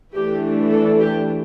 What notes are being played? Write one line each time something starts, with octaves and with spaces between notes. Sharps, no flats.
E3 A3 D4 G4
A4
G4